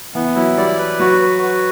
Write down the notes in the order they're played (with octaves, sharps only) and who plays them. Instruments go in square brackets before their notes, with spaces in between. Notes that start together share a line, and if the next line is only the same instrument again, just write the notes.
[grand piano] E3 [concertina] B3
[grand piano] F#3 [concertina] E4
[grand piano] G3 [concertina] D5
[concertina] B4
[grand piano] F#3 [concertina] F#4
[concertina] B4
F#4